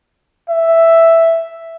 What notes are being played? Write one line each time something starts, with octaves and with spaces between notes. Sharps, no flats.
E5